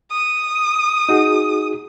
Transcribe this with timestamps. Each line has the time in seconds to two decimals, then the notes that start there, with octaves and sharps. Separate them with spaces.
0.11 D#6
1.09 D#4 F#4 G#4